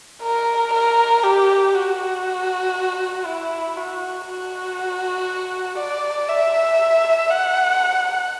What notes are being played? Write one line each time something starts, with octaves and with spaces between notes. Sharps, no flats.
A#4
A#4
G4
F#4
E4
F#4
F#4
D5
E5
F#5